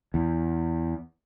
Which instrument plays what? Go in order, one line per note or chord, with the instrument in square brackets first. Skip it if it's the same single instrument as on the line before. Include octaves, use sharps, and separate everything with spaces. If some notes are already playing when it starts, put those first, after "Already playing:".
[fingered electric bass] E2